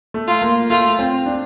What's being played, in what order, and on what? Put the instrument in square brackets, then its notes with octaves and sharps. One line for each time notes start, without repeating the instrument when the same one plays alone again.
[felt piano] A3
[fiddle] F4
[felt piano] A#3
[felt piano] A3 [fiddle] F4
[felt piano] C4
D4